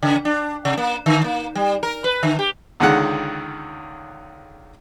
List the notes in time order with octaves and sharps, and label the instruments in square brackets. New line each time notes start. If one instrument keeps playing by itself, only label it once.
[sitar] C#3
D4
C3
A#3
D3
A#3
G3
A#4
B4
D3
G4
[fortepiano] C#2 D3 D#3 G#3 F#5